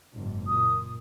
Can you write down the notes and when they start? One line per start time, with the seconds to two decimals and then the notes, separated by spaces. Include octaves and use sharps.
0.14 F#1 G#2
0.47 A#2 D#6